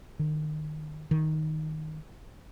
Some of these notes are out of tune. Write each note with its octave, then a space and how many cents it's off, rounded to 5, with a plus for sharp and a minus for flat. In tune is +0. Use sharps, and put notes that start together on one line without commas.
D#3 -30
D#3 +0